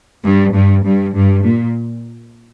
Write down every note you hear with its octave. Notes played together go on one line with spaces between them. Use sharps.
G2
G2
G2
G2
A#2